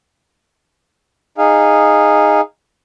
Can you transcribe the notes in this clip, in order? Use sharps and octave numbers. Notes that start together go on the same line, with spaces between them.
D#4 G#4 F5